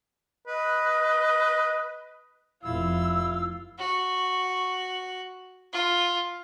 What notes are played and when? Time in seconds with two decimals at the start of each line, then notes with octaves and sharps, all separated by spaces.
0.47 B4 D#5
2.63 F1 F2 E4 F4 E6
3.79 F#4
5.73 F4